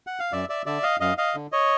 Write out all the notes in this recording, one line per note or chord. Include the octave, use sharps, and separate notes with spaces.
F#5
F5
F#2 D5 E5
D5 E5
D3 D5 E5
D#5 F5
F#2 D#5 F5
D#5 F5
D3
C#5 D#5